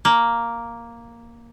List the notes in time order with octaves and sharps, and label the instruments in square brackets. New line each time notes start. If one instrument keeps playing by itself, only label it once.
[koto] A#3